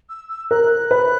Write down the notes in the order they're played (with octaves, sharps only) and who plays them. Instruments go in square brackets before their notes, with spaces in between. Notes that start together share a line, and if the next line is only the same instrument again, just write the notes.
[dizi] E6
E6
[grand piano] A#4 [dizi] F#6
[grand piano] B4